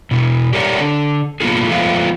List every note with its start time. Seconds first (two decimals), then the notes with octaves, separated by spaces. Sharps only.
0.11 B2 E4
0.53 G4 A#4 C#5 D5 F#5
0.80 D3 D4
1.40 A#3 B3 D#4 F4 F#4 G#4
1.67 F3 G#3 A3 B3 D4 F4